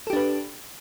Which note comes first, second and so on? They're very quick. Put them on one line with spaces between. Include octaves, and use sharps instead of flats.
A4 G4 D4 B4